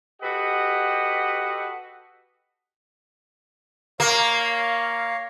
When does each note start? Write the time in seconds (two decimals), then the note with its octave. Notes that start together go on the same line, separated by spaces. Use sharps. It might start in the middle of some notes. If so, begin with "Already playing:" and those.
0.22 F#4 G4 A4 B4 D#5 F#5
4.00 A#3 C#5 F5